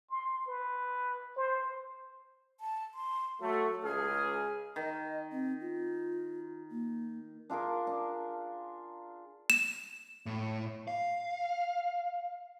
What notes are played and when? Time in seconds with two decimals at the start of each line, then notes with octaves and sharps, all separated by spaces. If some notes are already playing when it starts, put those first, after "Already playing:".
0.10 C6
0.48 B4
1.37 C5
2.60 A5
2.94 C6
3.41 F#3 A3 F#4
3.83 C#2 G#4 F6
4.76 D#3 D#5
5.32 C4
5.61 F4
6.71 A#3
7.50 D4 F4 G#4 A#4
7.87 D4
9.50 E7
10.26 A2
10.88 F5